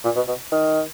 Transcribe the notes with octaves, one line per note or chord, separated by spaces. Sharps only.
A#2
B2
B2
D#3